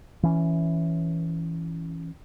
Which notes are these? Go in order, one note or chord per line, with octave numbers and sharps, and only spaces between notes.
E3 C#4